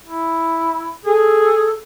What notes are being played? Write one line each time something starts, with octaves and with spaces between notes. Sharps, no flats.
E4
G#4 A4